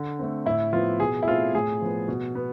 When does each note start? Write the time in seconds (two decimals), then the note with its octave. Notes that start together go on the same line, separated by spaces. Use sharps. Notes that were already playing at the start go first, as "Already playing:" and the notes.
Already playing: D3
0.19 A3 C4
0.46 A2 E4
0.73 F3 B3 F4
1.00 B2 G#4
1.23 E4
1.27 A3 C4 F4
1.55 A2 G#4
1.82 F3 B3
2.08 B2
2.35 B3